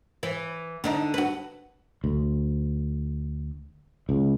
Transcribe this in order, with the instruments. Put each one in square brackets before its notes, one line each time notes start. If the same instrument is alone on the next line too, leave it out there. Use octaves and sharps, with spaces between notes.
[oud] E3
D3 D4 D#4
F#4 B4
[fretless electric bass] D2
C#2